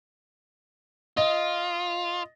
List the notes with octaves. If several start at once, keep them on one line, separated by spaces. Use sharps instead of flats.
F4 D#5